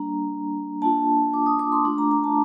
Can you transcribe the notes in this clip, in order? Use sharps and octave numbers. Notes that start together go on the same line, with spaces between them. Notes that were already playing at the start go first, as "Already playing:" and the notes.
Already playing: G3 A#3 D4 A#5
A#3 D4 F4 A5
D6
D#6
D6
C6
A3 D4 F4 D6
A#5
A#5
A5